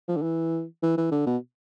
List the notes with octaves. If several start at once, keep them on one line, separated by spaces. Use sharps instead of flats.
F3
D3
E3
E3
E3
D3
B2